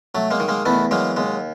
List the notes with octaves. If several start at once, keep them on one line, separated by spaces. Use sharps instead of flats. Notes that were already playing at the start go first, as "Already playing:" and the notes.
F#3 A3
G#3 A#3
D#3
G#3 A#3
E2 A3 B3
F#3 G#3 A#3
D#2 G#3